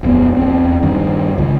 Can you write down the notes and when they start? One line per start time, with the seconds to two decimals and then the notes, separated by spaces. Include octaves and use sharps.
0.03 D#1 F2 B3
0.37 E2 C4
0.83 G2 D#3
1.38 C#2 C#3